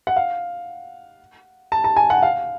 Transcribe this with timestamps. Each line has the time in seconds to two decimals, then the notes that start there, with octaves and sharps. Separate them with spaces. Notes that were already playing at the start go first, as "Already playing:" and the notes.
0.07 F#5
0.16 F5
1.72 A5
1.84 A5
1.96 G#5
2.10 F#5
2.22 F5